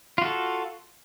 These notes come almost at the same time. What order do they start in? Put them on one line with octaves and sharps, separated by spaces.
F4 F#4 A4